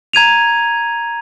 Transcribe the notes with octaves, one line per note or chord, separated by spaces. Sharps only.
A#5 G#6 D#7 F7